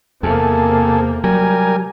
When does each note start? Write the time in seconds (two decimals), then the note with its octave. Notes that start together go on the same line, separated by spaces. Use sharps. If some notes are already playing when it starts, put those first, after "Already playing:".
0.23 E2 C3 A#3 G#4 A4
1.24 F#3 G3 A#4 G#5